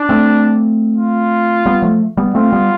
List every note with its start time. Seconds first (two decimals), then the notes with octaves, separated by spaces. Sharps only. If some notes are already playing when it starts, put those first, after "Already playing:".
Already playing: D4
0.09 A3 C4
0.96 F4
1.66 G3 B3
1.82 F3 A3
2.17 G3 B3
2.34 A3 C4 F4
2.53 G3 B3